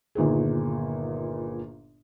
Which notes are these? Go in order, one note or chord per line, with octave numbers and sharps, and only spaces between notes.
G1 A#2 D#3 G#4